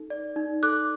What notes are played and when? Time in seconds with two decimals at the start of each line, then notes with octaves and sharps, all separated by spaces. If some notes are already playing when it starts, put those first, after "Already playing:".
Already playing: D#4 A4
0.10 D5
0.36 D#4
0.63 A4 D6 F#6